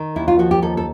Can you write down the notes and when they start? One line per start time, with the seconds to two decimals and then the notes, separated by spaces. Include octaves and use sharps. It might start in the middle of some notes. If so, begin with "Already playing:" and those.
Already playing: D#3
0.16 D#2 E4
0.28 F4
0.39 F3 F#4
0.51 G4
0.62 D#2 A4
0.77 A4